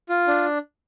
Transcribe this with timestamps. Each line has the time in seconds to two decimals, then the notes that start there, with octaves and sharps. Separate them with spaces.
0.09 F4
0.27 D4